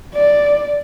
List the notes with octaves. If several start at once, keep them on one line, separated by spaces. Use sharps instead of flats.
D5